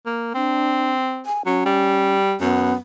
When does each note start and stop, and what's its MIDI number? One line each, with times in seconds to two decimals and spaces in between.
0.06 0.32 58
0.34 1.23 60
0.34 0.92 62
1.26 1.42 80
1.46 1.64 54
1.46 2.16 61
1.65 2.35 55
2.41 2.74 42
2.41 2.73 59